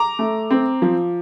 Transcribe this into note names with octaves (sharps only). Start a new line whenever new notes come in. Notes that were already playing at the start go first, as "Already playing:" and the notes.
Already playing: A#5 D6
A3
C4
F3